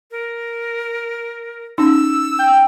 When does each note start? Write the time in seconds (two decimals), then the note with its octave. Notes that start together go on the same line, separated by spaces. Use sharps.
0.11 A#4
1.78 C#4 D#4 E6
2.39 G5